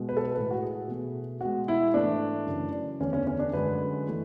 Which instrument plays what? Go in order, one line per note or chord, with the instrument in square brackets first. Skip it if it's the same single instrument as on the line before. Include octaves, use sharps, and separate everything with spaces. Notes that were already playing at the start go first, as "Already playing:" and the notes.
Already playing: [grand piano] B2 G#3
B4
A4
B4
A2 G#3 B4
F#4
G#4
B2 A3
B2 G#3 F#4
E4
G#2 E3 A3 D4
F#2 C#3 E3
E2 D3 A3 C#4
C#4
C#4
D4
F#2 D3 G#3 B4
E3 A3